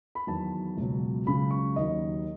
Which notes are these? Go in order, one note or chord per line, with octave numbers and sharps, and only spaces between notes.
B5
E2 D#3 F#3 A5
C#2 B2 F#3
C#2 C#3 F#3 B5
C#6
D#2 D#3 F#3 D#5